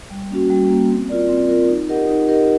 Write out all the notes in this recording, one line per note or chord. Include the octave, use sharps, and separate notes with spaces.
G3
A#3 C#4 F#4
G3
A#3 C#4 F#4
C4
F4 A#4 D5
C4
F4 A#4 D5
D#4
G4 A#4 D#5 F#5
D#4
G4 A#4 D#5 F#5